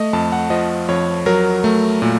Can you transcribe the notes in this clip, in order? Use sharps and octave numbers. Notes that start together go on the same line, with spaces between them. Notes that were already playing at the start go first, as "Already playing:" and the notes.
Already playing: A3 D#5
F2 A5
F#5
F3 D#5
F2 C#5
F#3 A#4
A3
A#2